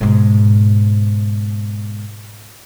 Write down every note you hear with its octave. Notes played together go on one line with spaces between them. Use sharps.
G#2 B2